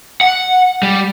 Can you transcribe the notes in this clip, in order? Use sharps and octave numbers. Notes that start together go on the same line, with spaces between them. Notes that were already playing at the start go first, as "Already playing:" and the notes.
F#5
G3